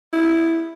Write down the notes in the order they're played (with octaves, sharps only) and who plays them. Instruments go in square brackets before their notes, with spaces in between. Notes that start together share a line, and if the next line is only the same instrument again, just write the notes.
[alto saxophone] E4